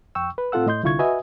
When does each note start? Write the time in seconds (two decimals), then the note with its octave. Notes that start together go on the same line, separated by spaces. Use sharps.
0.15 F2 G5 C#6 E6
0.38 B4
0.52 A2 C4 F4 A4 F#5 E6
0.67 A2 D#5 C6 G6
0.83 C2 D3 E4 F4 C#6 G#6
0.99 F#4 B4 D#5 E5 G#5 D#6